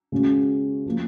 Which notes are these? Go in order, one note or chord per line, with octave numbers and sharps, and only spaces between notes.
C#3 G#3 C#4 F#4
F3 A#3